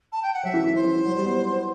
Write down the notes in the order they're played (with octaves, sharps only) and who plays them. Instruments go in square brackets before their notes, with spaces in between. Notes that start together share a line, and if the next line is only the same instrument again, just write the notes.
[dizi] A5
G5
F#5
[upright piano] F#3 [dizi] E5
[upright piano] E3
E3
[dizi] C5
[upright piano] E3
E3
F#3
G3
B3